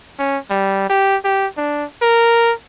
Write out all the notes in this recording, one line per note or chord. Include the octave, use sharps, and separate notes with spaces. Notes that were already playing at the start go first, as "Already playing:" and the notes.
C#4
G3
G4
G4
D4
A#4